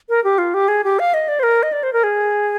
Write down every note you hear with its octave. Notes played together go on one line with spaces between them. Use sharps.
A#4
G4
F4
G4
G#4
G4
F5
D#5
D5
C5
A#4
D#5
D5
C5
A#4
G#4